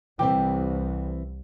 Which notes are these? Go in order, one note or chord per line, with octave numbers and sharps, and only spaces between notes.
C2 E3 C4 G4